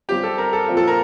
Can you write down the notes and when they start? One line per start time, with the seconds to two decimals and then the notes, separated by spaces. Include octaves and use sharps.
0.08 G3 C4 F4 G4
0.23 A4
0.38 A#4
0.53 A4
0.68 A#2 F3 C4 F4
0.77 A4
0.88 A#4